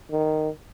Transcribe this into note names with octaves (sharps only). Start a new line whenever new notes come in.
D#3